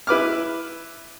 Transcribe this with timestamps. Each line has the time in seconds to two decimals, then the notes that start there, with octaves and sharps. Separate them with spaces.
0.07 E4 B4 D6 F6